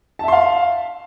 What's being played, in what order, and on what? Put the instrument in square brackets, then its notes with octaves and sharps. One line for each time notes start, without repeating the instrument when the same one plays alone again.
[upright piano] A5
E5
C6
F5